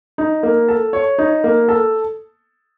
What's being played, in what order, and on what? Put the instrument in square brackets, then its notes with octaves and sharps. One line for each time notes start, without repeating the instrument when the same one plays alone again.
[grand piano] D#4
A#3
A4
C#5
D#4
A#3
A4